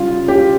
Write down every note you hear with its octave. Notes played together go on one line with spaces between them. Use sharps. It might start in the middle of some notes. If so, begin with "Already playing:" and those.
Already playing: C#3 G3 F4
G4